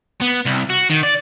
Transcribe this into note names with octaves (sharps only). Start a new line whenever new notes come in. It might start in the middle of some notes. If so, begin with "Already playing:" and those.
B3
C2
F#4
D#3
D5